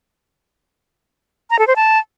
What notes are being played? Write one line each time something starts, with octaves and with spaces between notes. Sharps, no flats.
A#5
A4
C5
A5